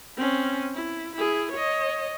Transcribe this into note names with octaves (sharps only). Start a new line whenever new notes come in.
C4 C#4
E4
E4 G#4
C#5 D#5